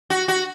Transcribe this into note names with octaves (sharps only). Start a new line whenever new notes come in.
F#4
F#4